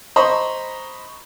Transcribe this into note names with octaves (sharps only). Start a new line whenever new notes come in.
C5 D#5 A#5 B5 C#6